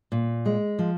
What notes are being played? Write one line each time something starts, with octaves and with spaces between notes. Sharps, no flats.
A#2
G#3
F3